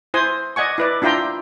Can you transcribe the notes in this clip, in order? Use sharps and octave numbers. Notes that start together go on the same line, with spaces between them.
E4 C5 G#5 C6 D#6
D5 D#5 F#5 G#5 C#6
E4 B4 D5
D4 E4 F4 G5 A#5 C6